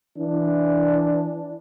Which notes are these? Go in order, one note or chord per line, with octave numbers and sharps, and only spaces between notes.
E3 D4